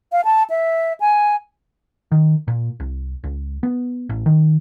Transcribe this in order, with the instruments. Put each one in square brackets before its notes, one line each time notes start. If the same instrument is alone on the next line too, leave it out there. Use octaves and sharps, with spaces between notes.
[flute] F5
A5
E5
G#5
[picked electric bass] D#3
A#2
C2
C#2
B3
A1
D#3